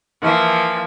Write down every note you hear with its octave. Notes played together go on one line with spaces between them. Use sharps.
E3 F3 A#3 E5